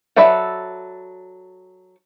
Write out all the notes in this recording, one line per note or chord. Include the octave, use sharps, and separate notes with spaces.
F#3 A4 B4 D5 E5